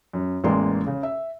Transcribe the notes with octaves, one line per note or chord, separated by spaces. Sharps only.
F#2
A1 E2 G#3 A#3 D5 C6
C#3
E5